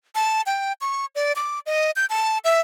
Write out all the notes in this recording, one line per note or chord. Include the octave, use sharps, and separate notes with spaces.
A5
G5
C#6
D5
D6
D#5
G6
A5
E5